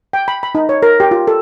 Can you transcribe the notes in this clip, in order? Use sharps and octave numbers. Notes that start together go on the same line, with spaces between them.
G5
B5
B5
D#4
C#5
A#4
G4
F4
A4